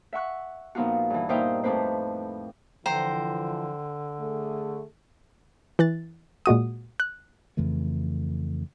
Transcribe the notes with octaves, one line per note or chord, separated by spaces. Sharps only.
E5 F#5 C#6 F#6
A#2 F3 B3 D#4 F4 F#4
G2 E3
A#2 D#4 C5 E5 F5 G5
F2 A2 C4 B4 C5
D3 E3 F3 C5 G5 A#5
A3 G#4 A4
E3 F#6 A6
A#2 G#3 F#4 D#6
F#6
F2 C#3 E3 A3